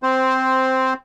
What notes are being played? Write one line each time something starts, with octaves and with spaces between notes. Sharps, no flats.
C4 C5